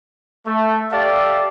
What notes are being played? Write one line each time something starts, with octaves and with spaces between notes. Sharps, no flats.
A3
G4 A4 D5 E5 F5